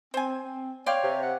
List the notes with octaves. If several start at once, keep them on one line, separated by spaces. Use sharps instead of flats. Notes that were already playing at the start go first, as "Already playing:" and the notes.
C4 C5 G#5
C4
C#5 D5 F5 G5 C6
C3
F#5